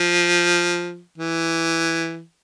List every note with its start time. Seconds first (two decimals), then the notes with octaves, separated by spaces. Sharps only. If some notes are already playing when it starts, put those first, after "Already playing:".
Already playing: F3
1.18 E3